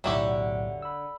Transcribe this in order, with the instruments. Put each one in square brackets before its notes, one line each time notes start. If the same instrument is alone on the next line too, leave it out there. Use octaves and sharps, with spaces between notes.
[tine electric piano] B1 E2 A2 [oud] D3 [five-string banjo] F#3 E4 G4
[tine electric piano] B5 E6